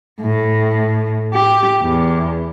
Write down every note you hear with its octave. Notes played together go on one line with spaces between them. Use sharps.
A2
G4
E2